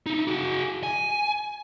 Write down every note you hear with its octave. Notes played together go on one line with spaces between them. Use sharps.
D#4 E4
F#4 G#4
G#5